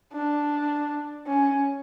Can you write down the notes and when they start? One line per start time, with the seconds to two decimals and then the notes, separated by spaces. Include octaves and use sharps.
0.13 D4
1.26 C#4